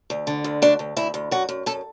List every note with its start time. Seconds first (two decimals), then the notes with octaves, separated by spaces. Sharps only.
0.10 D2
0.27 D3
0.44 D2
0.62 D2 D4
0.79 D2
0.97 D2 E4
1.14 D2
1.31 F#2 F#4
1.49 F#2
1.66 F#2 A4